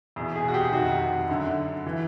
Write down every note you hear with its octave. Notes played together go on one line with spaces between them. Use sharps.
E2 B2
G#4
F#4
G4
F2 C3 D#3 F#4
F#2 D3
E3